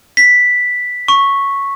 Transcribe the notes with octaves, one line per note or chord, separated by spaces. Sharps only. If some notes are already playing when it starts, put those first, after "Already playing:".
B6
C#6